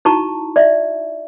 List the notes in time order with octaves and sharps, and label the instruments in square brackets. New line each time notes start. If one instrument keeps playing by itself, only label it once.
[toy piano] D#4 E4 F#4 A5 A#5 C#6
D5 E5